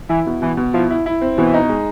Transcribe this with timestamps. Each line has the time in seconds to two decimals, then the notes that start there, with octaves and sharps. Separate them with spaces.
0.09 E3 E4
0.26 B2
0.42 B2 E3
0.57 B2
0.74 F3 E4
0.90 E4
1.06 E4
1.21 C4
1.38 B2 E3
1.54 D#4
1.69 G#3